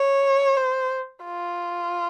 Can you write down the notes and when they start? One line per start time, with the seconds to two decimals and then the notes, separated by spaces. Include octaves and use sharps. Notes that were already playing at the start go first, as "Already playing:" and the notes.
Already playing: C#5
0.57 C5
1.24 F4